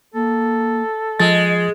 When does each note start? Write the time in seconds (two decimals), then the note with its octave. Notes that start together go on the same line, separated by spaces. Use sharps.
0.14 A#3 A4
1.20 F3 G#3 D#5 A6